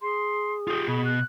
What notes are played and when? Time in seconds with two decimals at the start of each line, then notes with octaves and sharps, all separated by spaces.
0.02 G#4 C6
0.68 F4 G4 D#6
0.88 B2 B5
1.05 F#6